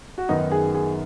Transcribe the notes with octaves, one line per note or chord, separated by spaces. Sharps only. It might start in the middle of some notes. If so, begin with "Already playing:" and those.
F#4
F#2 D#3 B3 D#4
G#4
G#4